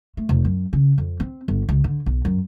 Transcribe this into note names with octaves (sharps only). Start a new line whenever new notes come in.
A3
F1
F#2
C#3
F2
C4
G1
C#2
D3
B1
F#2